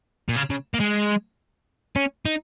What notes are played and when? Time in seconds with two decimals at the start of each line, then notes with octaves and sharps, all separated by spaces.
0.29 A#2
0.36 C#3
0.50 C#3
0.74 A#3
0.80 G#3
1.96 C#4
2.26 D#4